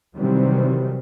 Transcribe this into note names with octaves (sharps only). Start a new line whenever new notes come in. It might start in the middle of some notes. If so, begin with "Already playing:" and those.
C3 D#3 E3 F#3 G3 C4